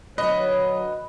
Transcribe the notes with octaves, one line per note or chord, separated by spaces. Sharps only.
D3 F#3 B4 C#5 D#5